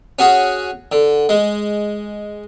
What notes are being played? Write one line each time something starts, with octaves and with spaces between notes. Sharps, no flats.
C#4 F#4 G#4
D3
G#3